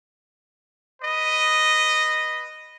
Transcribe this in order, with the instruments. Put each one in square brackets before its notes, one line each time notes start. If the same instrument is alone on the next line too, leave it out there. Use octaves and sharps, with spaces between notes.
[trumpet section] B4 D#5